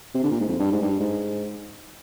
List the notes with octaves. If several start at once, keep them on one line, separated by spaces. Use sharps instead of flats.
C3
D3
A#2
G#2
F2
G2
G#2
G2
G#2